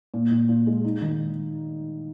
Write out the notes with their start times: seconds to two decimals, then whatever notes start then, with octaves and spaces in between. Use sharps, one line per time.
0.14 A#2
0.31 A#2
0.49 A#2
0.67 G#3
0.84 D#4
1.02 D#3